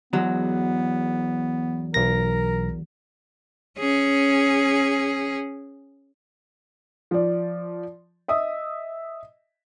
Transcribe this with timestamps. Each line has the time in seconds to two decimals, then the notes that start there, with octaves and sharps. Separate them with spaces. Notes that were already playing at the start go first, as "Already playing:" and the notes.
0.13 E2 F#3 G#3 B3
1.94 B1 A#4 A#6
3.79 C#4 G#4
7.11 F3 D5
8.28 D#5 E5 D#6